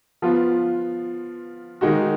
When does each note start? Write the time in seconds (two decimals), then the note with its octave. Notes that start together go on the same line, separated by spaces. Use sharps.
0.22 F3 B3 F4
1.81 D#3 G#3 D#4 F#4